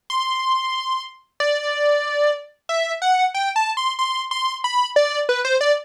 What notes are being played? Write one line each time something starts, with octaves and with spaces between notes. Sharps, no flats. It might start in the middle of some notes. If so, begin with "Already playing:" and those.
C6
D5
E5
F#5
G5
A5
C6
C6
C6
B5
D5
B4
C5
D5